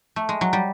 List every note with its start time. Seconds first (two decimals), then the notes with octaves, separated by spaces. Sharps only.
0.16 A3
0.29 G#3
0.41 F#3
0.53 G3